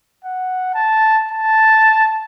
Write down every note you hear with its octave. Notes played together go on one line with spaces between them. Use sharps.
F#5
A5
A5